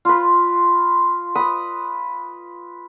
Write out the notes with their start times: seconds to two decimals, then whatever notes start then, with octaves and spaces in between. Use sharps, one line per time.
0.05 F4 B4
1.35 B4 D#6